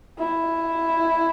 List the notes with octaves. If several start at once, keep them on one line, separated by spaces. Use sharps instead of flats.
E4